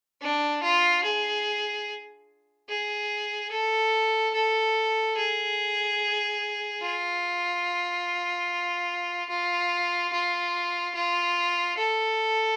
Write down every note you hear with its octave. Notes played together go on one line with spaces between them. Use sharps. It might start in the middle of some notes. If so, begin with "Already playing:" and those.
D4
F4
G#4
G#4
A4
A4
G#4
F4
F4
F4
F4
A4